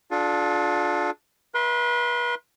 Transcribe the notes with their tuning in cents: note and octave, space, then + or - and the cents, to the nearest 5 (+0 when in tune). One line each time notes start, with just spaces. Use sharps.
D4 +0 F4 +25 A4 -45
B4 -35 E5 +0 C6 +0